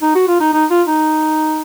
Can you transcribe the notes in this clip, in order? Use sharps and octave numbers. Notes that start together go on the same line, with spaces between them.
D#4
F#4
F4
D#4
D#4
F4
D#4